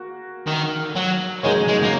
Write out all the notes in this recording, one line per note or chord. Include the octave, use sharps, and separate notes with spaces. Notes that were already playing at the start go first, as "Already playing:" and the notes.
Already playing: A#3 F#4
D#3
F#3
C#3 F#3 G#3 D#4 A#4 C#5
G#3
A#3